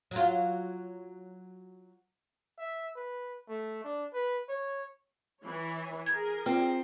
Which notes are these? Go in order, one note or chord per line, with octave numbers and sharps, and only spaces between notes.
F#3 F4
E5
B4
A3
D4
B4
C#5
E3 C#5
G#4 A#4 G#6
C4 F4